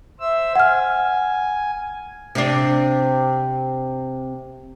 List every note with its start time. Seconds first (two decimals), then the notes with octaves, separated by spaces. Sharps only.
0.20 C5 E5 E6
0.56 F#5 G#5 F6
2.35 C3 D4